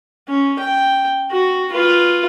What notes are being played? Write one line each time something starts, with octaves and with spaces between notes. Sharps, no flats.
C#4
G5
F#4
F4 B4